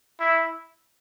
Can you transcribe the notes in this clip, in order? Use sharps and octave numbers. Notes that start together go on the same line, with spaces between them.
E4